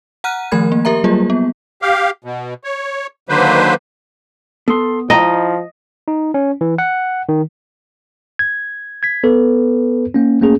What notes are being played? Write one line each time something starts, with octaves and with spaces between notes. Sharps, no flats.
F#5 A#5 F6 F#6 D#7
D#3 F3 A3 A#4 B5 G#6
A#3
G4 A#4 E5 A#5
F#3 G3 A#3 F4 G#4
B3
G4 F5
B2
C#5
D3 D#3 F#3 A#3 B4 C5
B3 A4 C6
F3 E4 D#5 G5 A#5
D#4
C#4
E3
F#5
D#3
G#6
G#6 B6
B3 A4 B4
A#3 C#4
A3 A#3 C#4 G#4